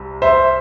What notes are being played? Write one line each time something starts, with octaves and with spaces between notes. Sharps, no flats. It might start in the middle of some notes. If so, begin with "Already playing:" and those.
Already playing: C2 C3
C5 E5